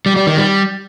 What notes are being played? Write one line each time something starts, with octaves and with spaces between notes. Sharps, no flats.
G3
G3
D#3
G3